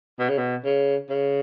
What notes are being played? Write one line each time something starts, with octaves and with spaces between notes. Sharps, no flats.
B2
C#3
B2
C#3
C#3